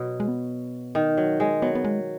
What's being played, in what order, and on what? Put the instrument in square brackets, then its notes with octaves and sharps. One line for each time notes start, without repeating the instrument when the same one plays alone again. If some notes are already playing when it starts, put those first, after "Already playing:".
Already playing: [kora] B2 F#3
[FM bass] G#3
B3
[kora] D#3
F#3
G#3
[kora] F#3 [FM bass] B3
[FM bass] B3
G#3